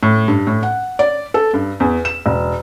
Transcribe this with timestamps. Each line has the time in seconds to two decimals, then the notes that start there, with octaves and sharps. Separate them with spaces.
0.03 A2
0.28 G2
0.47 A2
0.63 F#5
0.99 D5
1.34 A4
1.54 G2
1.80 E2
2.05 E7
2.26 E1